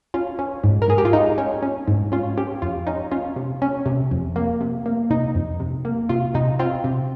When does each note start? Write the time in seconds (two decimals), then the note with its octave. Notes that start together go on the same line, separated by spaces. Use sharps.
0.14 C#4 F4
0.39 C#4
0.64 G#2
0.82 A#4
0.88 G#2 G#4
0.98 G4
1.05 F4
1.13 G#3 D#4
1.38 C#4
1.63 C#4
1.88 G#2
2.12 C#4 F4
2.38 C#4 G4
2.62 F2 F4
2.87 C#4 D#4
3.11 C#4 F4
3.36 C3
3.62 C#4
3.86 C3
4.11 F2
4.36 A#3
4.61 C3
4.86 A#3
5.10 C3 D#4
5.35 F2
5.60 C3
5.85 A#3
6.09 C3 F4
6.34 C3 D#4
6.59 C4 F4
6.84 C3